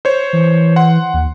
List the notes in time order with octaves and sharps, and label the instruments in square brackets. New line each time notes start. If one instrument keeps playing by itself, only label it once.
[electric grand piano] C5 C#5
[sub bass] E3
[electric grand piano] F#5 C6
[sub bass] D#2